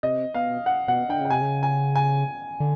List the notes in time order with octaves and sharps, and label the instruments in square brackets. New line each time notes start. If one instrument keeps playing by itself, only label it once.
[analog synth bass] C3 [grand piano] D#5
[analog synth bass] B2 [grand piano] F5
[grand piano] F#5
[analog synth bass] B2 [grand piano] F#5
[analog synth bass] D3 [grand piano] G5
[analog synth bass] C#3 [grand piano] G5
[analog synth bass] C3 [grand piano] G#5
[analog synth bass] C#3
[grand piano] G#5
G#5
[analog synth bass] D3